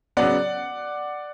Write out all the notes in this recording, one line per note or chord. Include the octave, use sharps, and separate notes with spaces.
C#3 F#3 B3 D5 F#5